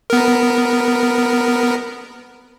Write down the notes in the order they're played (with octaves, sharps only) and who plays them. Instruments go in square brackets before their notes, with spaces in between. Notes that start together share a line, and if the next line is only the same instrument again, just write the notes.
[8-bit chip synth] B3 A#4